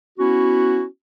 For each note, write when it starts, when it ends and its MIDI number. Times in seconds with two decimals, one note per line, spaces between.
0.19 0.84 59
0.19 0.84 61
0.19 0.84 64
0.19 0.84 66